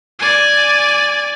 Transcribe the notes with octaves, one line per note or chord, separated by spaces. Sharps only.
D5 G#5